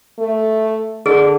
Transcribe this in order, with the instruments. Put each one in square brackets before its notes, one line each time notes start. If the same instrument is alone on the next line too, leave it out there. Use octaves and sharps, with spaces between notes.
[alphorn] A3
[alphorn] D3 [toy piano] G#4